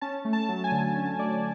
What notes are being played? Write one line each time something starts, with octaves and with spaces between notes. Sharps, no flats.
C#4 A5
A3
A5
F#3
G#5
D3
C#4
A3 D5